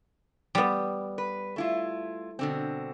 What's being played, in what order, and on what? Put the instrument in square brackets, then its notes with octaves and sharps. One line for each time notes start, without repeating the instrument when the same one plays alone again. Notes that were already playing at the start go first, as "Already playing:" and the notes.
[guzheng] G3 B3
[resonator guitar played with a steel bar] B4
A3 E4 F4
B2 D3 C4